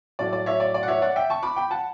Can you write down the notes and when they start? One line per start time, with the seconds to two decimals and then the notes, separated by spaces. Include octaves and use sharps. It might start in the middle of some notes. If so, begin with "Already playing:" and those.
0.19 A2 F#3 A3 D5
0.33 D5
0.46 C#5 E5
0.60 D5
0.74 D5
0.83 F#5
0.88 C#5 E5
1.02 D5 F#5
1.16 E5 G5
1.30 A5 C#6
1.43 B5 D6
1.56 G5 B5
1.71 F#5 A5